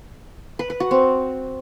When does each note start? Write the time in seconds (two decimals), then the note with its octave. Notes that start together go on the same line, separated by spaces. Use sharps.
0.59 B4
0.70 B4
0.80 F#4
0.91 C4